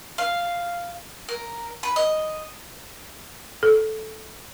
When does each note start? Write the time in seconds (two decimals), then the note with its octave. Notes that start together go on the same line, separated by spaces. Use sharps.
0.18 F5
1.29 A#4
1.83 B4
1.96 D#5
3.63 A4